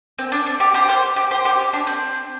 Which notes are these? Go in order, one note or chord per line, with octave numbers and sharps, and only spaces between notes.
C4
D4
D4
G4
G4 C5
G4 C5
G4
G4 C5
G4 C5
G4
D4
C4